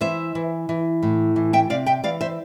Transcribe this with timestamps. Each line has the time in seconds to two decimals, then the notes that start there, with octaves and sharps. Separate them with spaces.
0.01 E3 C5 E5
0.35 E3
0.69 E3
1.03 A2
1.36 E3
1.53 E5 G5
1.70 C3 D5 F5
1.86 E5 G5
2.04 E3 D5 F5
2.21 C5 E5